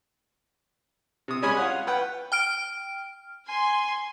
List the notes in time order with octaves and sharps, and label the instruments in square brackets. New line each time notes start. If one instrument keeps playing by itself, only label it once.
[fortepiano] C3 D#6
G3 G#3 C#4 G#5 B5 D#6
F4 C#5 F#5
B4 F#5 G5
[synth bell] G5 F6 D7
[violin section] G#5 C6